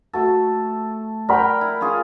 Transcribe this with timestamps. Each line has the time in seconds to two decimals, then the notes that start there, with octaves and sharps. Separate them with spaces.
0.13 A3 F#4 A4
1.29 A#4 D5 F#5 G5 B5
1.61 E4
1.81 C#4 F4 G#4